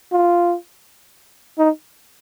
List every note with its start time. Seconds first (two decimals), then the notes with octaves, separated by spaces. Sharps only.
0.12 F4
1.59 D#4